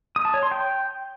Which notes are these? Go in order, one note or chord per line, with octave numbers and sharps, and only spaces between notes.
D#6
A5
C#5
C6
G5